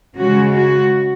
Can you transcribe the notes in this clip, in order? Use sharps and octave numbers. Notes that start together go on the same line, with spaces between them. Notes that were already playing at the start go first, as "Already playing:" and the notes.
C#3 G#3 C#4 F#4
F#4